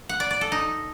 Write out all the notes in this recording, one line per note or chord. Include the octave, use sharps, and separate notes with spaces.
F#5
D5
D5
A4
D#4